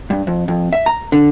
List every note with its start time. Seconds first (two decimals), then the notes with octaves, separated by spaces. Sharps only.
0.10 G2
0.27 F2
0.48 F2
0.73 E5
0.86 A#5
1.12 D3